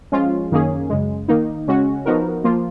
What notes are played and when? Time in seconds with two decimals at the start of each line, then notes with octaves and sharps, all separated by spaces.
0.12 F3 G#3 C#4 F4
0.51 F#2 D#3 A#3 C#4 G#4
0.90 F#2 C#3 G#3
1.28 D#3 A#3 D#4
1.67 C#3 G#3 C#4 F#4
2.06 F3 B3 D#4 F#4 A#4
2.44 F3 A#3 F4